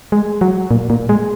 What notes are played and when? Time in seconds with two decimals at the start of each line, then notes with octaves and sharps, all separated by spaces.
0.12 G#3
0.41 F#3
0.71 A#2
0.90 A#2
1.09 G#3